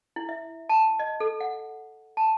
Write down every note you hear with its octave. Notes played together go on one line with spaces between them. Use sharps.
E4
E5
A5
D#5
A4
F#5
A5